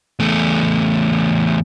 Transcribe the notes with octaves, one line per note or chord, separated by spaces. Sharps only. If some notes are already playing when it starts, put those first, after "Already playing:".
E2 A3